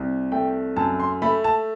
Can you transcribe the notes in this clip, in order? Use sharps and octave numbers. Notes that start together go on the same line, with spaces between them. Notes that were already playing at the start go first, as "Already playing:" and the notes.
Already playing: C2
A3 G5
F#2 A5
C6
A3 B5
A5